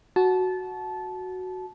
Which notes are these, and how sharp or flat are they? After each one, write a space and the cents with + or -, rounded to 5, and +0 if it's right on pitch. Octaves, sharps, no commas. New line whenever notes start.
F#4 +0 A5 -20